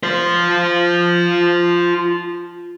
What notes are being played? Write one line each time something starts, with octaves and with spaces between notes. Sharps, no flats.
F4 C5